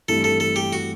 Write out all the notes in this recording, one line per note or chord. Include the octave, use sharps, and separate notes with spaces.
G2 E3 A3 C4 E4 A4
A4
A4
G4
F#4